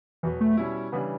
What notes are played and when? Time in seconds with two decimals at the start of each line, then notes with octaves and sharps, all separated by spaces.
0.23 E2 B2 E3 F#3 B3
0.41 A3
0.57 B2 G3 C#4 E4
0.92 C#3 E3 G3 B3 D4